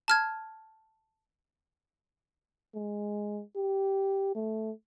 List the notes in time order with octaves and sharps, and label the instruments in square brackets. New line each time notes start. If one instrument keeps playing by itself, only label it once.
[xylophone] A5 F6 G#6
[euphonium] G#3
G4
A3